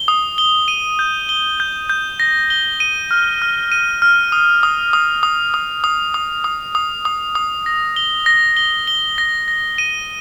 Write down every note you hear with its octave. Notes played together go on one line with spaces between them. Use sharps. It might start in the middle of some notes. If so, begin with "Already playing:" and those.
Already playing: G7
D#6
G7
D#7
G6
G7
G6
G6
A#6
G7
D#7
F6
F6
D#7
F6
D#6
D#6
D#6
D#6
D#6
D#6
D#6
D#6
D#6
D#6
D#6
A#6
G7
A#6
G7
G7
A#6
A#6
D#7